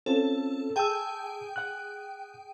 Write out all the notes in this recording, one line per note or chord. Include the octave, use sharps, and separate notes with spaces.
C4 C#4 F4 A4
G#4 G5 A5 E6
F#5 F#6